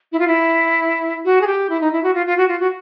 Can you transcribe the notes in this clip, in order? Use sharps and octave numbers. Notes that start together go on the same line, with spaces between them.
E4
F4
E4
F#4
G#4
G4
E4
D#4
E4
F#4
F4
F4
F#4
F4
F#4